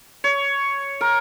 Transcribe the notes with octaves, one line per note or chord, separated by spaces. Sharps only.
C#5
A#4